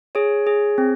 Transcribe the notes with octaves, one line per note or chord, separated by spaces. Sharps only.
G#4 C#5
G#4
C4